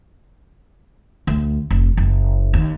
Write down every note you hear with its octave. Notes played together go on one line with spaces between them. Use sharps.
D2
F1
F#1
D#2